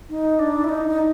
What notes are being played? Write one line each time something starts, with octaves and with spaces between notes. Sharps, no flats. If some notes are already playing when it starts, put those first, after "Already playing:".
D#4
D4
E4
D#4
D#4